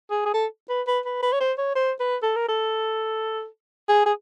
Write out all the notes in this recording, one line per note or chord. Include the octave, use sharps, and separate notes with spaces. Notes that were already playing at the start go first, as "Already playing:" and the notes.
G#4
G#4
A4
B4
B4
B4
B4
C#5
C5
C#5
C5
B4
A4
A#4
A4
G#4
G#4